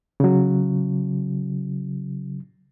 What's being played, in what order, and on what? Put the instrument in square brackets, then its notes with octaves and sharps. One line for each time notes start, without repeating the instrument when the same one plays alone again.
[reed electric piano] C#3 F#3